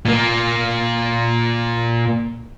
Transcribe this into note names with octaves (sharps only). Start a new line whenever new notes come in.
A#2 A#3